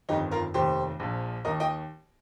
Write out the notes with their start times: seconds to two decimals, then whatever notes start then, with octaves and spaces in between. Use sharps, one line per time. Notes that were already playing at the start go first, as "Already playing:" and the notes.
0.09 G1 F2 D#3 D#4 G4
0.31 F4 A#4
0.54 F1 D#2 D#3 G4 C5
1.00 A#1 A#2 F3
1.45 D#2 D#3 A#4 D#5
1.60 D#5 G5